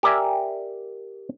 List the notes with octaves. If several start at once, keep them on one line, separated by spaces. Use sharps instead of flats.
G4 A#4 D5 E5 G#5